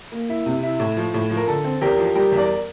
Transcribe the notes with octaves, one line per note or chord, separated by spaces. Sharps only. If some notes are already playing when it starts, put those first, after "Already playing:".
A#3
E4
C3
E4
A2
F3
A2
F3
A#4
D3 A4
C4
E2 G4 A#4
F3
G3 G4 A#4
E2
A#4 D5